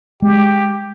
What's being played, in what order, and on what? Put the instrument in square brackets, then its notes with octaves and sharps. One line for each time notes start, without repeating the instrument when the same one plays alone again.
[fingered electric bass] G#3 [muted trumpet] G4